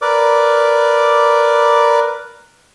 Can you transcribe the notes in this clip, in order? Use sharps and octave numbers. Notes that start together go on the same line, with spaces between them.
A#4 B4 D5 D6